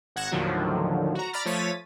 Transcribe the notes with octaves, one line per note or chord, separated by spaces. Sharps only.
G#1 F#5 F#6 G#6 A#6 E7
D#2 A2 D3 D#3 F3 F#3
F#4 A#5
D5 A#5 B5 F6 A6
F3 A3 C#5 A6 B6 D#7